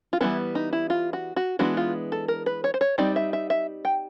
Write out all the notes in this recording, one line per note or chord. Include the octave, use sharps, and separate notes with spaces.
F4
E3 G3 B3 E4
D#4
E4
F4
F#4
F#4
E3 G#3 B3 D4 F#4
F4
A4
A#4
B4
C#5
C5
C#5
G3 C4 D#4 D5
E5
E5
E5
G5